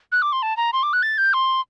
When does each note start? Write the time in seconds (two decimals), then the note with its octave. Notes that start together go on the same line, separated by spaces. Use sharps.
0.12 F#6
0.22 D6
0.32 C6
0.42 A5
0.57 A#5
0.73 C6
0.83 D6
0.93 F#6
1.03 A6
1.18 G6
1.33 C6